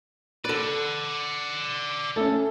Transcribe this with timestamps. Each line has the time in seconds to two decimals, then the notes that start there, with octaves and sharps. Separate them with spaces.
0.45 A4 B4 D5 F#5
2.16 A3 C#4 A4